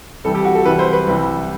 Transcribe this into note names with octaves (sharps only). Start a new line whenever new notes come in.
C2 C3 E3 G3 A4
G4
F#4
A4
C2 C3 E3 G3 B4
C5
B4
C2 C3 E3 G3